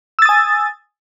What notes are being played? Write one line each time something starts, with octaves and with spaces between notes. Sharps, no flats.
G#5 D#6 E6 A6